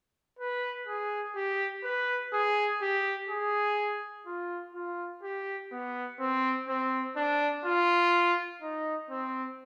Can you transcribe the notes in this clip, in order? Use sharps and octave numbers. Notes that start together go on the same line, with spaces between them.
B4
G#4
G4
B4
G#4
G4
G#4
F4
F4
G4
B3
C4
C4
D4
F4
D#4
C4